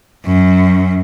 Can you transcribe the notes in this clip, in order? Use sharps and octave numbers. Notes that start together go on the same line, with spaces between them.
F#2